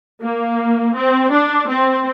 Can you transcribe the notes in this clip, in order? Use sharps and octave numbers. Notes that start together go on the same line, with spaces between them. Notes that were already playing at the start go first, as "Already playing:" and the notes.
A#3
C4
D4
C4